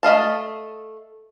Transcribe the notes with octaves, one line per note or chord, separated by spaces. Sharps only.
A3 D#5 F5 A5